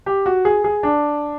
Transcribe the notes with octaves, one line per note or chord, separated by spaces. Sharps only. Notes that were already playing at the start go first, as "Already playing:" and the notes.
G4
F#4
G#4
G#4
D4